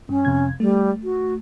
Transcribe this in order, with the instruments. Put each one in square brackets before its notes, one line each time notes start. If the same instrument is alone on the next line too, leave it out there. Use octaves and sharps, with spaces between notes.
[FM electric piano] G2 [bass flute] C#4
[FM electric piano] F2 C3 G#6
[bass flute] G3 [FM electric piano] A3
[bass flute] F#4